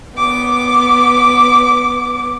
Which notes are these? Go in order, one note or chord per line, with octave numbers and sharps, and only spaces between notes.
B3 D6